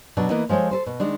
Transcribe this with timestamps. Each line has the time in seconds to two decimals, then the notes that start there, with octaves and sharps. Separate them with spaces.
0.17 B2 F#3 D4
0.30 E3 A#3 B3 E4 D#5
0.49 F3 G#3 A4 C5 C#5
0.71 A4 B4 C5
0.86 B2
1.00 D#3 G#3 D4